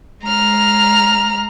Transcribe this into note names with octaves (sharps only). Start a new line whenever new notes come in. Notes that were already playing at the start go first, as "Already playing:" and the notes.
G#3 A#5 F6